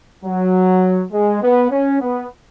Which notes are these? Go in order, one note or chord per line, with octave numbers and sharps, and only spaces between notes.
F#3
G#3
B3
C#4
B3